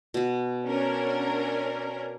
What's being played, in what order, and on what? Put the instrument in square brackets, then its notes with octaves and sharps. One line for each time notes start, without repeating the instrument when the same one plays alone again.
[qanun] B2 F#4
[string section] C#4 D4 A#4